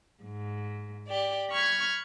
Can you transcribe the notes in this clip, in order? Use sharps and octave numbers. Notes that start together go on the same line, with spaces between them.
G#2
G4 D5
B5 C#6 F6 G#6